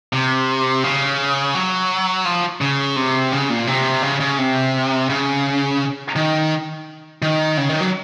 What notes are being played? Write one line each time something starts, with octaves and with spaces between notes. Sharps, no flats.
C3
C#3
F#3
F3
C#3
C3
C#3
A#2
C3
C#3
C#3
C3
C#3
D#3
D#3
C#3
D#3
F#3